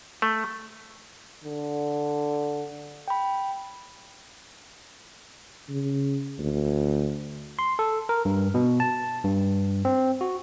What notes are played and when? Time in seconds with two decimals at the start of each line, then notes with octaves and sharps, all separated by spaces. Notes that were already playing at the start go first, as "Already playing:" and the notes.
0.22 A3
1.44 D3
3.08 G5 B5
5.70 C#3
6.38 D2
7.59 C6
7.79 A4
8.09 A#4
8.25 G2
8.54 B2
8.80 A5
9.24 G2
9.85 C4
10.21 F#4